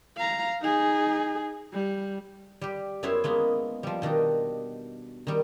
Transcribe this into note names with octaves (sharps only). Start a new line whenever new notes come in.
F5 A#5
D#4 G#4
G3
G3 G4
F#2 B3 E4 C#5 E5 C6
G#3 A#3 B3
F3 G3
B2 D#3 D4 D#4
D#3 G3